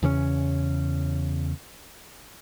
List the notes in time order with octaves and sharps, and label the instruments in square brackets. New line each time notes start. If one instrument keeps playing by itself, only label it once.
[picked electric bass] E2 C#3 A#3 C#4